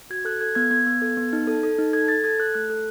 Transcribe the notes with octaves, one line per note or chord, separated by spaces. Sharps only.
F#4 G#6
A4 F#6
A4 G#6
B3 G#6
B3 G#6
B3
A4
B3
D#4
A4
A4
D#4
A4 G#6
A4 A6
A4 G#6
A4 F#6
A3 F#6
A4